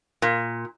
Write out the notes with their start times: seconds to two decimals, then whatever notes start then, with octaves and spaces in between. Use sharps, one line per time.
0.22 A#2